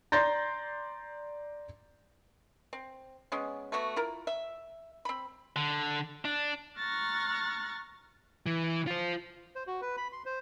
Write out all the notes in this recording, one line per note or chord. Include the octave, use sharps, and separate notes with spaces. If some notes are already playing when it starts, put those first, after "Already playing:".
D5 A#5 C6 G6 A6 A#6
C4
G#3 B3 C#4
A3 B3 F#4 E5
E4 F4 A#4
E5
C4 B5
D3
D4
A#5 C#6 F6 F#6 A6 A#6
E3
F4 C5
C5
F#4
B4
B5
C6
C5